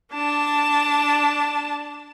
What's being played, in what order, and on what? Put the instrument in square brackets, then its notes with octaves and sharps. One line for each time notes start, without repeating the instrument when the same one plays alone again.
[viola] D4 A5